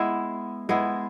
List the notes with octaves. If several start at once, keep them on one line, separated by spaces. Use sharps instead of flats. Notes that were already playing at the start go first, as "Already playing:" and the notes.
Already playing: G#3 B3 E4
G#3 B3 E4